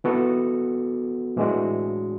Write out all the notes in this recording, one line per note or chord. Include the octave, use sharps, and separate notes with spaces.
E3 B3 F#4 A4
A2 E3 G#3 D4 F#4